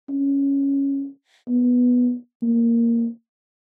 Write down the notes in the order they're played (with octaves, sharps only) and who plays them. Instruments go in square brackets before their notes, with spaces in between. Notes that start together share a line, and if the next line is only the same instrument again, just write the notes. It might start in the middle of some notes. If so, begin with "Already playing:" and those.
[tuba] C#4
B3
A#3